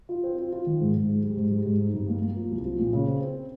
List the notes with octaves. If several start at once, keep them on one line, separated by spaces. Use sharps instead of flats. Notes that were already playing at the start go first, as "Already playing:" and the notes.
F4
C4
F4
F4
D#3
G#2
G#2
G#3
G3
G#2
G3
G#2
D#4
G2
A#3
A#3
F3
C2
F3
A#2
C#3
C4
C4